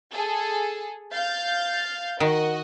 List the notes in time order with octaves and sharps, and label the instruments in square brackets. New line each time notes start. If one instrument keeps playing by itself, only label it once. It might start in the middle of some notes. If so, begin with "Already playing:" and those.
[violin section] G#4 A4
F5 G6 A6
[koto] D#3 [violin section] F#4 D#5